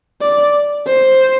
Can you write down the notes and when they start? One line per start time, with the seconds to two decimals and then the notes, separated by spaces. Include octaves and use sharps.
0.21 D5
0.87 C5